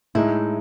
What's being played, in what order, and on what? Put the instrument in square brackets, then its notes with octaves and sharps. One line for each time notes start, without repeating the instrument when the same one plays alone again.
[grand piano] A2 G#3 D#4 [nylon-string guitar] E4